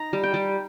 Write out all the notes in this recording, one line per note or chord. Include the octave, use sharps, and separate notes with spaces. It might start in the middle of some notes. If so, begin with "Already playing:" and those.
Already playing: D#4 A#5
G3
G5
G3